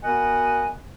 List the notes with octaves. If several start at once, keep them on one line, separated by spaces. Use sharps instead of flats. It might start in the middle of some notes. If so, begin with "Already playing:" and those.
B3 F#4 A#4 D#5 F#5 G#5